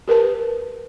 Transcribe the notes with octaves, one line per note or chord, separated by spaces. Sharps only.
G4 A#4 B4 A5